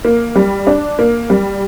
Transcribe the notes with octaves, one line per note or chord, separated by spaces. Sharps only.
A#3
G3
D4
A#3
G3